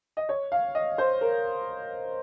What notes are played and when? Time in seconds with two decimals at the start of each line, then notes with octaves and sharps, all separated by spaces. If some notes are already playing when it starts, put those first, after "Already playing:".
0.17 D#5
0.29 C#5
0.52 F5
0.75 D#5
0.98 C5
1.21 A#4